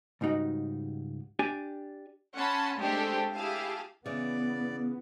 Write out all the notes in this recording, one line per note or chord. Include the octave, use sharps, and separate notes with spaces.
C#2 G#2 G3 D#4 F#4
D4 G4 D5 G#5
C#4 F#5 A5 B5 C6
G#3 A3 C4 D4 G4 A4
E4 G4 G#4 F5 A5
C#3 E3 B3 D5